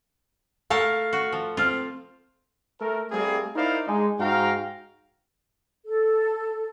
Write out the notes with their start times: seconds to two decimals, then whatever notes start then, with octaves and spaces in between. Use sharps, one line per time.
0.70 A3 A#4 F5 A5
1.13 F#4
1.33 F3
1.57 C4 F4 F6
2.79 A3 A4 A#4
3.11 G3 A3 A#3 C4 E4 G#4
3.55 D#4 E4 A#4 C5 D5 F5
3.86 G#3 D4 D#4
4.19 G#2 F#4 F5 G5 A#5
5.85 A4